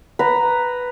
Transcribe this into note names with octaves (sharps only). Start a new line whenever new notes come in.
B4 A#5